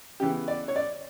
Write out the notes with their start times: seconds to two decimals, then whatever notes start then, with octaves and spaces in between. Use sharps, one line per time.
0.20 C#3 E3 B3 G4
0.48 D5
0.68 C#5
0.76 D5